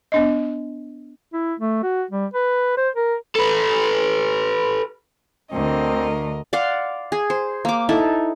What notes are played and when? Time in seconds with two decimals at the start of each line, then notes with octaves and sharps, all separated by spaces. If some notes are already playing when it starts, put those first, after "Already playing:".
0.12 B3 D4 D#5
1.33 E4
1.60 A3
1.83 F#4
2.11 G3
2.34 B4
2.77 C5
2.96 A#4
3.35 A4 B4
5.52 D2 D3 C4 A#4 D#5
6.53 D5 F5 F#5 C6
7.12 G#4
7.30 C5
7.65 A#3 D6
7.89 D#4 E4 A4